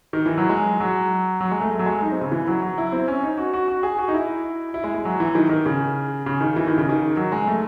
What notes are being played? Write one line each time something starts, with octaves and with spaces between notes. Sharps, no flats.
D#3
E3
F#3
G#3
F#3
F#3
G#3
A3
A3
F#3
G#3
D#4
C4
C#3
E3
F#3
F#3
E4
C4
C#4
D#4
F#4
F#4
F#4
G#4
F#4
D#4
E4
E4
G#3
G#3
F#3
E3
D#3
D#3
C#3
C#3
D#3
E3
D#3
C#3
D#3
F#3
G#3
A3